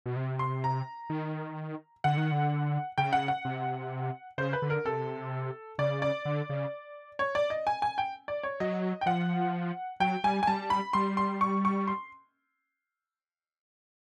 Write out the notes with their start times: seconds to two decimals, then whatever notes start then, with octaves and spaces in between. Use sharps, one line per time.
0.06 B2
0.16 C3
0.39 C6
0.64 A#5
1.10 D#3
2.04 D3 F#5
2.17 D#3
2.32 D3
2.98 C#3 G5
3.13 F#5
3.28 F#5
3.45 C3
4.38 C#3 C5
4.53 B4
4.62 D3
4.70 A#4
4.85 C3 A4
5.78 C#3 D5
6.02 D5
6.25 D3
6.49 C#3
7.19 C#5
7.35 D5
7.50 D#5
7.67 G#5
7.82 G#5
7.98 G5
8.28 D5
8.43 C#5
8.60 F#3 D#5
9.01 G5
9.06 F3 F#5
10.00 F#3 G5
10.24 G3 G#5
10.43 G#5
10.47 G3 A5
10.70 B5
10.93 G3 C6
11.17 C6
11.41 C#6
11.65 C#6
11.88 C6